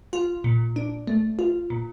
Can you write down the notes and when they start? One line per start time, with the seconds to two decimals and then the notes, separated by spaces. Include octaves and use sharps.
0.13 F4
0.44 A#2
0.76 D4
1.07 A3
1.39 F4
1.70 A#2